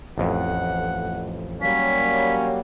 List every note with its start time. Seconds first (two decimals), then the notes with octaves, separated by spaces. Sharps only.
0.18 A1 F2 F#5
1.62 F#3 G3 A#3 C#4 B6